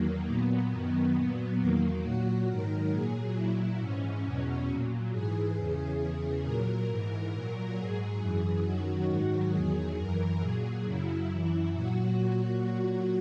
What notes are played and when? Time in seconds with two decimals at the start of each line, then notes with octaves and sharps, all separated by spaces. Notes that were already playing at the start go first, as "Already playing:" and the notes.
Already playing: E2 D#3 F#3 A#3
0.26 A#2 F#3 B3
0.71 F#2 D#3 F#3
1.15 A#2 F#3
1.59 E2 D#3 F#3 A#3
2.02 A#2 F#3 F#4
2.47 G#2 D#3 F#3 A#4
2.91 A#2 F#3 G#4
3.35 A#2 F#3 E4
3.79 G#2 E3 C#4
4.24 E2 B2 F#3
4.68 A#2 F#3
5.11 G#2 E3 G#4
5.56 E2 C#3 E3 G#4
5.99 E2 C#3 E3
6.43 A#2 F#3 A#4
6.88 G#2 E3
7.32 A#2 F#3
7.76 G#2 F#3 G#4
8.20 F#2 E3
8.64 F#2 D#3 F#3 F#4
9.08 G#2 D#3 F#3
9.52 E2 D#3 F#3 G#4
9.96 F#2 E3 A#4
10.40 A#2 F#3 G#4
10.84 F#2 C#3 F#3 E4
11.28 F#2 E3
11.72 A#2 F#3 F#4